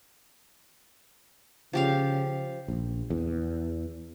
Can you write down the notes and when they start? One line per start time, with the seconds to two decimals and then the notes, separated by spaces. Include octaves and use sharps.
1.73 C#3 F3 G4 F5
2.68 A#1
3.10 E2